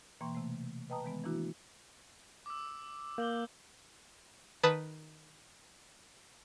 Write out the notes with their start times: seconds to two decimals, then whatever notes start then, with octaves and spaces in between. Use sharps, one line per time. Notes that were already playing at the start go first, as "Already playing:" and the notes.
0.21 B2 E3 A#3 G5 C6 C#6
0.35 C3 A3
0.90 B4 D#5 G5 A5 A#5 D#6
1.04 D#3 E3 G#3 B3
1.24 E3 A3 A#3 D4 E4 F#4
2.46 D6 E6
3.18 A#3 G6 F#7 G7
4.63 D#3 B4 A5 D#6